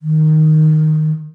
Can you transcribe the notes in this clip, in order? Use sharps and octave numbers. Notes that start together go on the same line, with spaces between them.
D#3